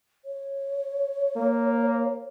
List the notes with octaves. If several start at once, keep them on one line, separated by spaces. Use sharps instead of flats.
C#5
A#3